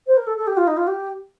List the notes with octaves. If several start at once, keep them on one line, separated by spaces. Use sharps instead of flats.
C5
A#4
A4
A4
G4
F4
D#4
F4
G4